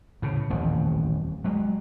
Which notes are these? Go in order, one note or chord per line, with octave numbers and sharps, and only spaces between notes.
A2 C#3
D#1 A1 F2
F#3 G#3